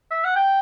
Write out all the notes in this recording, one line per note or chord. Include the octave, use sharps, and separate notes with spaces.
E5
F#5
G5